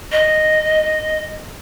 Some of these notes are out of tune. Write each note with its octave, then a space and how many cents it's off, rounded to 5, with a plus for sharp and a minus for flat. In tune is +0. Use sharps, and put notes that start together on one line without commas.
D#5 -5